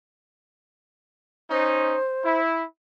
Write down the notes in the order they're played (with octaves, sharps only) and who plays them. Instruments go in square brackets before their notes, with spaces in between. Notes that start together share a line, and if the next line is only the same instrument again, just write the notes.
[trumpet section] C#4 D#4 [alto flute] C5
[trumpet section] E4